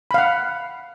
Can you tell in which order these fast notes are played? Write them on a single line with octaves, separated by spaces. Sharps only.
B5 F5 F#5